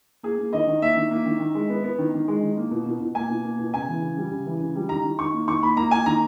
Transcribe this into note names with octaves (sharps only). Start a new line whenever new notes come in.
A#3 G#4
A#3
D#3 D#5
D#3
A#3 E5
D#3
A#3
D#3
D#3
G#3
B3
B3
D#3
D#3
G#3
D#3
A#3
B2
B2
B2
A#3 G#5
B2
A#3
B2
C#3 G#5
E3
C#3
G3
C#3
E3
C#3
G3
D#3 A#5
D#3
D#3 C#6
A#3
D#3 C#6
A#3 B5
A#3 A#5
A#3 G#5
D#3 A#5